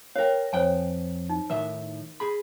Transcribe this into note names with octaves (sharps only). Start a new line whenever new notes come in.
A#4 C#5 F5 G5
F2 C5 C#5 G5 G#5
D#4
A2 D#3 A#4 E5
G#4 B5